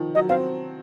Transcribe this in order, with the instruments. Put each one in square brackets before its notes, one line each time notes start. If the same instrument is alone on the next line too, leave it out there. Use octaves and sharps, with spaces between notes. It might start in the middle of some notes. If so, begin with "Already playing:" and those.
Already playing: [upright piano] D#3 F3
[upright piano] F#3 [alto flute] D#5
[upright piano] C4 [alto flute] F5